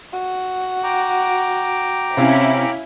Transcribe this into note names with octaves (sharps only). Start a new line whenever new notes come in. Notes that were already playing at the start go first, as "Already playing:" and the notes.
F#4
G5 A#5 D6
C3 C#4 E4 F5